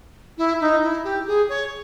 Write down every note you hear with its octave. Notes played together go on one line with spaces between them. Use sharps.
E4
D#4
E4
G4
G#4
C#5